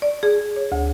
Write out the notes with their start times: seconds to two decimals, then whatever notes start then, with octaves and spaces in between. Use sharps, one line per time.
0.02 D5
0.23 G#4
0.56 C#5
0.72 D2